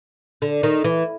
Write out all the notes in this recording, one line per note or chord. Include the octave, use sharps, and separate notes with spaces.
D3
D#3
E3